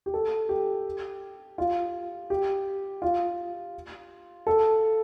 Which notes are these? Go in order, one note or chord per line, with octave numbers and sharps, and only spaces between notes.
G4
A4
G4
F4
G4
F4
A4